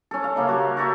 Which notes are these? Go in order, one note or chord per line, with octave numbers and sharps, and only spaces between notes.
C#4 A4
F5
C#3 A#3 E5
F#4 G4 C#5
F#4 A4 E5 G5